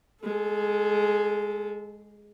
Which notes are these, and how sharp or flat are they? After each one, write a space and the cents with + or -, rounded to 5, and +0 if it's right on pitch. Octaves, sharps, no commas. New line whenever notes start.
G#3 +0 A4 -30